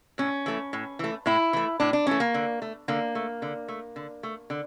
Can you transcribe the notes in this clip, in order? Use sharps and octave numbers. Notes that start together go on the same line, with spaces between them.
A2 C#4
E3 A3
A2
E3 A3
A2 E4
E3 A3
A2 D4
D4
E3 A3 C#4
A#3
D3
A3
D3 A#3
A3
D3
A3
D3
A3
D3